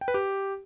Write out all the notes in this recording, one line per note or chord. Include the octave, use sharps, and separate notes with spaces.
G5
B4
G4